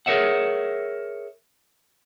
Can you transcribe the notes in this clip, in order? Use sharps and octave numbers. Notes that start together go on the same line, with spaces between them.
G#4 A#4 B4 C#5 E5 F#5